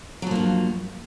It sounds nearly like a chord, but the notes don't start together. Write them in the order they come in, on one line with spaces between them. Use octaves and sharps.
F#3 F3 A#3 G2